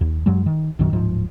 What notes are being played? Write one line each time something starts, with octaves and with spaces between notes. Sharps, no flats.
D#2
F#2 F#3 G#3
D#3
A#1 F#2 D#3 F#3
D1 G#2 F3